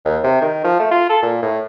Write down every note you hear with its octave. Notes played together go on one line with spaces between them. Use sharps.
D#2
C3
D#3
F3
A3
F4
A4
A#2
A2